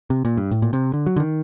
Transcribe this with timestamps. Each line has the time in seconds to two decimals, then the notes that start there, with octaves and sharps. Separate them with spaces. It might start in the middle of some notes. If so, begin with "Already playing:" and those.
0.10 C3
0.25 A#2
0.37 G2
0.51 A2
0.62 A#2
0.73 C3
0.93 D3
1.06 F#3
1.16 D3
1.20 D#3